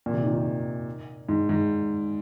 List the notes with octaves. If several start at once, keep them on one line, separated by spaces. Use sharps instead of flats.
A#2
C3
D#3
D#3
G#2
G#2